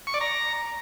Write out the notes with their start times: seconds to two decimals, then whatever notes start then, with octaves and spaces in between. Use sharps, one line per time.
0.07 C#6
0.14 D5
0.21 A#5